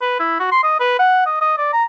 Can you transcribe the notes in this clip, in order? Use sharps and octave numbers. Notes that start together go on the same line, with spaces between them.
B4
E4
F#4
C6
D#5
B4
F#5
D#5
D#5
D5
A#5